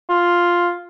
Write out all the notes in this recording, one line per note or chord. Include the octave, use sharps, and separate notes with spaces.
F4